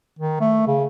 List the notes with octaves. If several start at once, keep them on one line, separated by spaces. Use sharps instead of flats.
D#3
A3
C#3